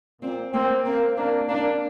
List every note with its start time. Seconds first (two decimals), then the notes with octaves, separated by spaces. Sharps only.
0.22 A#2 C4
0.54 A#3 C4
0.85 A#3 C4
1.16 A#3 D4
1.48 A#3 D4